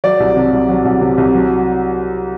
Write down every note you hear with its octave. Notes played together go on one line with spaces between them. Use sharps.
F#3 D5
C2
C3
C2
F#3
C2
C3
C2
F#3